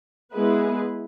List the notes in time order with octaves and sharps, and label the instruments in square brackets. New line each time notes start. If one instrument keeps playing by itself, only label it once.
[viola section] G#3 B3 E4 G#4 B4